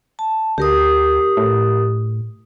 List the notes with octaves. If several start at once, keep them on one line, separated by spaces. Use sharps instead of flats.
A5
D2 G4 A#4 D#6
A2